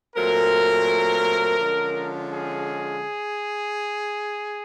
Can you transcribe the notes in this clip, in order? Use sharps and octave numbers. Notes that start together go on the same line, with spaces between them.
A#2 F#3 A3 C4 A#4
D3 F3 G#3 C#4
G#4